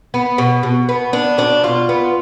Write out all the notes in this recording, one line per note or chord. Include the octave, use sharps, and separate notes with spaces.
B3
B2
B2
B3
B3 D4
B2 D4
B2 F4
B3